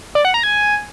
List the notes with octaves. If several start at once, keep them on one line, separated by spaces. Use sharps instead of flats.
D5
F#5
A#5
G#5